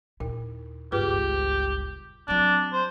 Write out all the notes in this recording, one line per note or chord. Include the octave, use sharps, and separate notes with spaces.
D#2 A#2 E4
G1 C#2 F4 G4 G#4 B4
F#3 C4 D4
C5